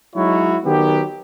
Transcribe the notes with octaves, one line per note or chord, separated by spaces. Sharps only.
F#3 G#3 D#4 E4 F#4 C#5
D#3 F#3 B3 G4